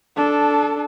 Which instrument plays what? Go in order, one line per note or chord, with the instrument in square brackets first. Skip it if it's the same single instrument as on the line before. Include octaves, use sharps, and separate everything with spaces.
[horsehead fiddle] D4 A4